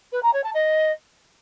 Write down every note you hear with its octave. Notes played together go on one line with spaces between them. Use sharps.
B4
A#5
C#5
A5
D#5